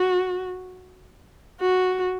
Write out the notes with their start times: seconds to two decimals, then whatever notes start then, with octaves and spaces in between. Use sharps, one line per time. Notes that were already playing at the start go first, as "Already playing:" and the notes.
Already playing: F#4
1.60 F#4